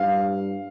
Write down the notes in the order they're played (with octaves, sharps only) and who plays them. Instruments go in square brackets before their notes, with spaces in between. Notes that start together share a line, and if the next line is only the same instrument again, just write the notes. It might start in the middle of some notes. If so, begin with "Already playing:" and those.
Already playing: [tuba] G2 [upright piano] F5